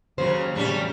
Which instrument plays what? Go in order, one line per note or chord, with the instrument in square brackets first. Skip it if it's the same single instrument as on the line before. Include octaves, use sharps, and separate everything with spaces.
[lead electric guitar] D#2 [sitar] C#3 [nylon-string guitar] F#3 C5
[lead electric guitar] E2 D4 [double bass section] A2 C#3 [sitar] G3 C#4